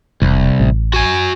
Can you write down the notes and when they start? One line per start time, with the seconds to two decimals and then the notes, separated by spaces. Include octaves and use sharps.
0.22 E1 C2
0.60 A1
0.94 F#4 G#5